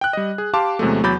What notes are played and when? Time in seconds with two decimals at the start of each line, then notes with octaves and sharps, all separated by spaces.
0.01 G5 F#6
0.13 G3 D#5
0.38 G#4
0.54 G4 F5 A5 C6 D6
0.79 E2 C3 F#3 G#3 A3
1.03 E2 F#3 B5 D6 G6 A6